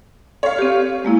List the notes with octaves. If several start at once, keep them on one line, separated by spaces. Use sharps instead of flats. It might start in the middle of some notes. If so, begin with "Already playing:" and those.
A4 C#5 F5
C4 G4
G#3 A#3 E4